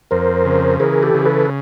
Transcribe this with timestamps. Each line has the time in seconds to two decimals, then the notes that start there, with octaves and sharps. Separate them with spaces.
0.11 F2 A#4 C5
0.45 C#3
0.80 E3 G#4 A#4
1.03 G4 A4
1.14 C#3
1.26 A4 B4